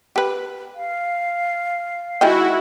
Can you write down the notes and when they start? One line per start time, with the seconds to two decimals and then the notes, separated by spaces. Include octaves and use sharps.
0.16 G4 B4
0.75 F5
2.21 D#3 G#3 E4 F#4 G5